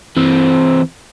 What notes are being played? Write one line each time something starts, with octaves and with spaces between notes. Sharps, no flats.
E3 C4